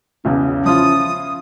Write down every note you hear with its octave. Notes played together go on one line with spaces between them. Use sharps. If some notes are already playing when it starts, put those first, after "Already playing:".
B1 E2 C#3 C#4
F3 E4 F4 D#6